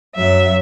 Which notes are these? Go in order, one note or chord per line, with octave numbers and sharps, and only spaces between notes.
F#2 F#3 E5